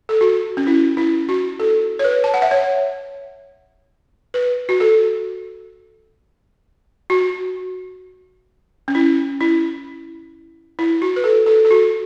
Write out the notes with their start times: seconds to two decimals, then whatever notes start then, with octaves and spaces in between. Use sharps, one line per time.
0.09 A4
0.21 F#4
0.57 C#4
0.67 E4
0.97 E4
1.29 F#4
1.60 A4
1.99 C#5
2.04 B4
2.24 A5
2.34 F#5
2.42 E5
2.51 C#5
4.34 B4
4.69 F#4
4.80 A4
7.10 F#4
8.88 C#4
8.95 E4
9.41 E4
10.79 E4
11.02 F#4
11.16 B4
11.24 A4
11.46 A4
11.65 A4
11.71 F#4